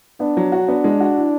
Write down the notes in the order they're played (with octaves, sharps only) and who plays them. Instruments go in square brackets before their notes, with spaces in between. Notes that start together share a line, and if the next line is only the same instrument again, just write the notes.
[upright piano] B3 [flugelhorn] D4
[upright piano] F#3
F#4
[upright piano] B3 [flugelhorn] D4
[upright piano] G#3
F#4
E4